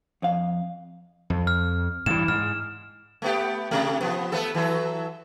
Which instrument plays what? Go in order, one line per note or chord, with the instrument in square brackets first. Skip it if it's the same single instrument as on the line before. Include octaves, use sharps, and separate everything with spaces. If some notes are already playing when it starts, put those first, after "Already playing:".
[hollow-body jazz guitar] F2 F5
[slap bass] F2
[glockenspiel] F6
[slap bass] G2 E3 [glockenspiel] E7
[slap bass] G#2 [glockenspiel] F6
[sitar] A3 B3 G4
C3 A3
F3 B3
A3 B3 A4
E3 F#3 A4